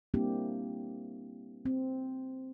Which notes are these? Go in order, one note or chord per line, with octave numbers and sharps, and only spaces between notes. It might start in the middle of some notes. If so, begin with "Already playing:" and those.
G3 A#3 C4 D4 E4 G4
C4